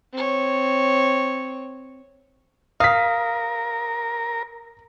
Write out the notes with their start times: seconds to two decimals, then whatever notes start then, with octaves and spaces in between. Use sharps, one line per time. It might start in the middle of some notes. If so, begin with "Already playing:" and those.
0.13 C4 C#5
2.80 A#4 F5 D#6 B6